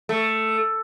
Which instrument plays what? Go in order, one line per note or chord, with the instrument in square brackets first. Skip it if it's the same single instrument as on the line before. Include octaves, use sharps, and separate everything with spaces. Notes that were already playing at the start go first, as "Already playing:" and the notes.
[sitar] A3